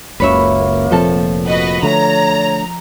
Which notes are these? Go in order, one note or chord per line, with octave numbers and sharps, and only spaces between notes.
F#1 C#2 F#2 A#3 B4 C#5 E5
F1 A#2 F3 C4 A4 A5
F#4 B4 D#5
D3 A3 C#5 A#5